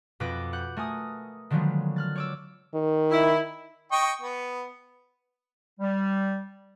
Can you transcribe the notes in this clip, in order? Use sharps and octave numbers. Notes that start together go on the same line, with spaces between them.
F2 B2 B4 D6 F#6 A#6
F#5 F#6 G6
A3 A#4 G#5 D#6
D3 D#3 F3 F#3 G#3 B3
F6 F#6 A6
C#5 D6 E6
D#3
E4
D#5 G5 C#6
B3
G3